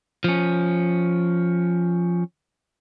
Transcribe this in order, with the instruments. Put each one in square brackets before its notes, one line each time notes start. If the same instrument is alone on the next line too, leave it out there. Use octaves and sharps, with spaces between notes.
[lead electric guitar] F3 C#4